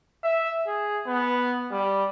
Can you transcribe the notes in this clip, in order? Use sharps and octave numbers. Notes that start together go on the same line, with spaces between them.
E5
G#4
B3
G3